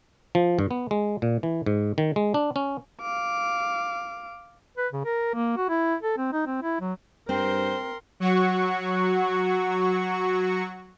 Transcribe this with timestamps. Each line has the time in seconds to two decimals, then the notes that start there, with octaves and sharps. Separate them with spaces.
0.35 F3
0.59 G2
0.71 B3
0.91 G#3
1.22 A#2
1.43 E3
1.66 G#2
1.98 D#3
2.16 G#3
2.34 D4
2.56 C#4
3.01 F5 D6
4.77 B4
4.93 C#3
5.05 A#4
5.34 A#3
5.57 F#4
5.69 E4
6.03 A4
6.17 C4
6.32 D#4
6.47 C4
6.62 E4
6.81 F#3
7.29 G2 C4 A#4 C5 C6
8.20 F#3 F#4 C#6